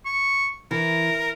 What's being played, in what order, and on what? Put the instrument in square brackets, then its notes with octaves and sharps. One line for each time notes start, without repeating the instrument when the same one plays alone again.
[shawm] C#6
[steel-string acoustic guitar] E3 [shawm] A#4